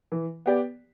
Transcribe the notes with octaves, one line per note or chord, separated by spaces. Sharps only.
E3
B3 G4 D5